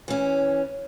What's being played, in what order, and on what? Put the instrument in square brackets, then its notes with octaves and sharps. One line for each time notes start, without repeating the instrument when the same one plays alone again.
[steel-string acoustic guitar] E3 C#4